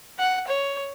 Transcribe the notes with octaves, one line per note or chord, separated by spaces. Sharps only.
F#5
C#5